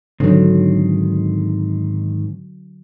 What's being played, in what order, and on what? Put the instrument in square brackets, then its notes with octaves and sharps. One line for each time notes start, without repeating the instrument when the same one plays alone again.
[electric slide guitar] G#2 D#3 C4 [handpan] D3 F#3